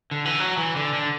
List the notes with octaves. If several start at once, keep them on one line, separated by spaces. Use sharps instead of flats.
D3
E3
F#3
E3
D3
D3